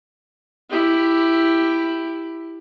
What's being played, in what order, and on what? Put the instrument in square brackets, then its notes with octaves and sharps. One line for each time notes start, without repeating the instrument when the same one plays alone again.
[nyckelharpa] E4 G4